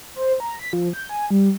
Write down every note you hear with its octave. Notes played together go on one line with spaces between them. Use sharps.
C5
A#5
B6
F3
G6
G#5
G3